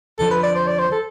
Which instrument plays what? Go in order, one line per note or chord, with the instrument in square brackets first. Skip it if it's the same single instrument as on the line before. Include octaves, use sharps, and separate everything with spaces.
[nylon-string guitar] F2 D3 F3 [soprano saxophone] A4
[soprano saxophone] B4
D5
C5
D5
C5
A4